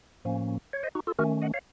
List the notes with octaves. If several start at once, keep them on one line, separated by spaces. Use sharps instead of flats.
A2 F3 A#3 C#4
C#5
C5 D#5
D#4 F#4
F4 A4
D#3 A3 C#4 F#4 A#4
D#5 F#5
C#5 F5